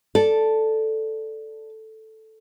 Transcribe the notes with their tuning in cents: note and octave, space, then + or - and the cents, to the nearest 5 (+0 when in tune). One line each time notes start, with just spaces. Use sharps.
A4 +0 D5 -5